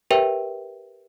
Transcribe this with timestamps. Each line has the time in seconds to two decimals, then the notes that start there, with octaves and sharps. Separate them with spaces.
0.11 G4 A#4 B4 C#5 E5 G5